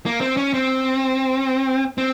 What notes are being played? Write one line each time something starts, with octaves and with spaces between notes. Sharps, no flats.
A#3
C4
C#4
C4
C4